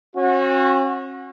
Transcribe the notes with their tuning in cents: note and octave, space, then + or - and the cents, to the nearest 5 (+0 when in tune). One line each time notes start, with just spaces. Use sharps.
C#4 -45 F#4 -20